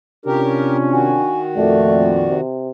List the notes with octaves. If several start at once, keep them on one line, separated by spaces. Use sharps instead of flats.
C3 C#4 D4 F4 G4 A#4
D#3 F#4 G#5
F2 A#2 A3 D5
C3